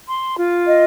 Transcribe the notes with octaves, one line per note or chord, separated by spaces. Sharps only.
C6
F4
D#5